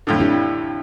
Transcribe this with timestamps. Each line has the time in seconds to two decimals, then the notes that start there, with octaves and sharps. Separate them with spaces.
0.07 F2 A2 D3
0.20 D4 E4 G4